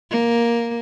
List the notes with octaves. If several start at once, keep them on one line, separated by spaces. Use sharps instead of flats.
A#3